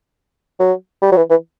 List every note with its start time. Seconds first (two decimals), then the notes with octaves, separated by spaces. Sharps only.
0.60 F#3
1.02 G3
1.12 F#3
1.17 E3
1.30 E3